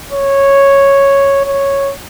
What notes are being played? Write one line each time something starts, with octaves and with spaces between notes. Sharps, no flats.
C#5
C#5